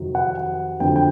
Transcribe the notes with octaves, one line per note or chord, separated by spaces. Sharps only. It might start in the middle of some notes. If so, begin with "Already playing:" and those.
Already playing: F2 C3 D#3 F#3
F#5
F2 D3 F#3 G5
G5